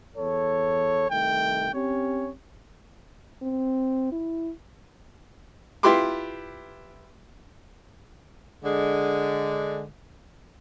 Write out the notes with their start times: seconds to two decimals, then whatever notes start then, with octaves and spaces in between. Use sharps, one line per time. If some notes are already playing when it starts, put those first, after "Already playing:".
0.15 E2 A4 C#5
1.08 C2 D#3 A3 G5
1.73 C4 C#4 G4 C#5
3.42 C4
4.12 E4
5.83 E4 F4 G4 B4 C6 D6
8.64 D3 G#3